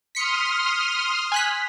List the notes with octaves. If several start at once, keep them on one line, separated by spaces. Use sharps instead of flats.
C6 D#6 F6 B6 C#7
G#5 F#6 B6